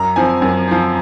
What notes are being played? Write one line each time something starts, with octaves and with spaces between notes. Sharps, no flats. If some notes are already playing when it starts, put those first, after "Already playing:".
Already playing: F#2 A#5
F3 C4 G#5
F#2
F3 C4